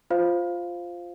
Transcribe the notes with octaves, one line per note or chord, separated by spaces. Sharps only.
F4 C5 F5